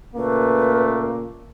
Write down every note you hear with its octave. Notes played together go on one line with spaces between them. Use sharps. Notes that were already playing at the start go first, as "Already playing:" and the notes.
A#2 C#3 A3 A#3 B4